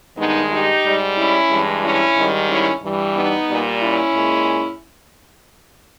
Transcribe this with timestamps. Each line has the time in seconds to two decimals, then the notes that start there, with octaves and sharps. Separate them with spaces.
0.17 G2 D#3 G#3 B3 D#4
0.50 D#4 G4
0.83 G#2 G3
1.16 C#4 E4
1.50 G2 E3 G#3
1.82 C#4 E4
2.15 G#2 D#3 G3
2.48 C#4 E4
2.81 G2 E3 G3
3.14 B3 D#4
3.47 A#2 G3
3.80 C#4 E4
4.13 A#2 G#3